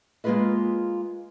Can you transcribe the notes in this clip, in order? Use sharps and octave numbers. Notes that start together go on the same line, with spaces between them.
G#3 A#3 F4 G#4 B4 D#5